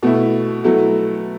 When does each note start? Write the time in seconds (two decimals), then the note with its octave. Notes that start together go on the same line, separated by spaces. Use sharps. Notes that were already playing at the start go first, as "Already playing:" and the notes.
0.03 B2 A3 E4
0.64 B2 F#3 A3 E4 A4